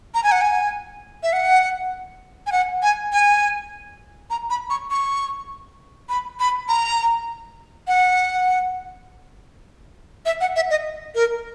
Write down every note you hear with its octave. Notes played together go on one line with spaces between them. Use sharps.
A#5
G#5
F#5
G#5
E5
F#5
G#5
F#5
G#5
G#5
A#5
B5
C#6
C#6
B5
B5
A#5
F#5
E5
F#5
E5
D#5
A#4